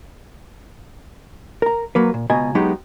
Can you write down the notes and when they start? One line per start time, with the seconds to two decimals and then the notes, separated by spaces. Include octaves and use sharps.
1.62 A#4 A#5
1.95 F#3 A#3 B4
2.14 A#2
2.30 C#2 B2 D#5 G#5 A#5
2.55 F#3 G#3 B3 D#4 G4